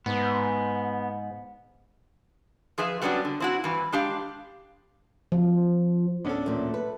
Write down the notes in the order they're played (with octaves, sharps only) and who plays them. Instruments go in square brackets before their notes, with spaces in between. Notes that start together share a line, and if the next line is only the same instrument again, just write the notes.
[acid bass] G#2 [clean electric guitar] B3
[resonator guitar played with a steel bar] F3 G#4 B4 E5
F#3 G3 B3 C#4 D4 F#4
D3
C4 E4 F#4
G2 E3
G#3 D4 G4 F5
[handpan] F3
[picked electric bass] D1 B3 C#4 [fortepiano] D4 A4
[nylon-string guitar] E2 A#2 [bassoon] A3
[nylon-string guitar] B4